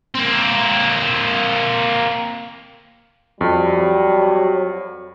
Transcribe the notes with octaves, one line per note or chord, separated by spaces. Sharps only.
A#3 C4
F2 F#3 G3